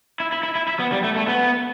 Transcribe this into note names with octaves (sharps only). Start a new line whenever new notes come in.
E4
E4
E4
E4
E4
B3
G3
A3
A3
B3